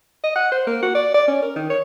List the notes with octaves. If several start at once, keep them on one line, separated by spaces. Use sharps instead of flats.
D#5
F#5
C5
A#3
F#4
D5
D5
C#4
A#4
D#3
C#5